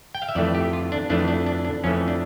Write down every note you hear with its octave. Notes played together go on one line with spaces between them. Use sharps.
G5
F5
E5
F2 E3 A3 D5
G4
F4
D4
F2 E3 A3 D4
D4
D4
D4
F2 E3 A3 C#4
D4